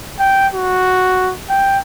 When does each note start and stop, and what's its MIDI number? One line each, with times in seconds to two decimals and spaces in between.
0.20 0.47 79
0.54 1.33 66
1.50 1.79 79